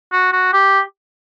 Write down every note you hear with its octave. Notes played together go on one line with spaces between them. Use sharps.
F#4
F#4
G4